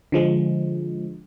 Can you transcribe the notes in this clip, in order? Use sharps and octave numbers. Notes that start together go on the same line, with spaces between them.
D3 F3 G#3